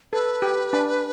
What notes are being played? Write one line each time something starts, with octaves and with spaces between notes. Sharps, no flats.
A4 B4
G4
D4